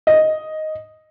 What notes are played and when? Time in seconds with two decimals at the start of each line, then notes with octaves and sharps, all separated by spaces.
0.07 D#5